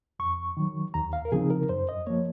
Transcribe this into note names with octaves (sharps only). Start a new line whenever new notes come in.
F2 C#6
D#3 F#3
D#2 A#5
F5
A#4
C#3 F3 C4 D#4 G#4
A#4
F#2 C5
D#5
F3 A#3 C#5